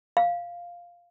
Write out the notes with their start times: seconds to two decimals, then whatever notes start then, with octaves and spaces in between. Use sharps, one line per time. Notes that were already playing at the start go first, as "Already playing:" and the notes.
0.17 F5